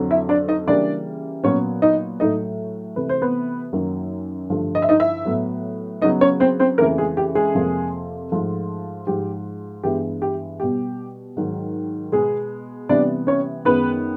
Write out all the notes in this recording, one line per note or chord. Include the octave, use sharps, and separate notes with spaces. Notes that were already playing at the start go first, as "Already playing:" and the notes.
Already playing: F2 D3 F#3
E4 E5
D4 D5
D#4 D#5
C#3 E3 G3 A#3 D4 D5
A#2 F#3 B3 C#4 C#5
D#4 D#5
A2 F#3 A3 D#4 D#5
C3 E3 A3 B4
C5
B3 B4
F#2 D#3 F#3 A#3
G2 D3 F3 A3
D#5
E5
D#4 D#5
E4 E5
A2 F#3 B3
C#3 F#3 B3 D#4 D#5
C#4 C#5
C4 C5
C4 C5
F2 C#3 E3 A3 A#3 A#4
G#3 G#4
G4
G#3 G#4
F2 C3 F3 A#3
G#2 F3 A3
G#2 F3 G#3 G4
G2 E3 G#3 B3 G4
G4
B2 G3 B3 G4
G#2 D#3 F#3
B2 G#3 B3 G#4
C3 E3 G3 B3 D4 D5
C#4 C#5
F#2 D#3 G#3 B3 B4